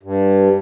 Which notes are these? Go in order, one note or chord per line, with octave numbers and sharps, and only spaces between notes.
G2